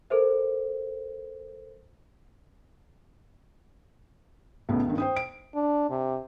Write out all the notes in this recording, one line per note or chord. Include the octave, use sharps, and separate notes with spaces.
A4 A#4 C5 E5
B1 A2 C#3 B3
C#2 G2 D#3
C5 G5 D#6
D7
D4
C3